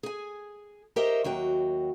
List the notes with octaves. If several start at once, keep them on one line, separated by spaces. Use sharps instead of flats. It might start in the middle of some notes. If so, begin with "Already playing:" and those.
G#4 G#5
G4 A#4 C5 C#5 D#5 E5
D#2 F#3 F#4 G5